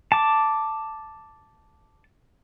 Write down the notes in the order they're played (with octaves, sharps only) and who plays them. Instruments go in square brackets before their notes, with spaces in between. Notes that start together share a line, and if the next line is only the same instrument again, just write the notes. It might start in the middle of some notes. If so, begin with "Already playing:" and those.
[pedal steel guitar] A5 D6